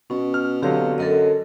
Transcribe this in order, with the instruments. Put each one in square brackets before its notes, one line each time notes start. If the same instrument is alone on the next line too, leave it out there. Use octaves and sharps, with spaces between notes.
[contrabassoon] B2 [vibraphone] C#4
[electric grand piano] F6
[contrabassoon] B2 [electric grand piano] D3 F#3 [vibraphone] C4 G4 F5
[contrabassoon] F#2 [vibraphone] A4 A#4 D#5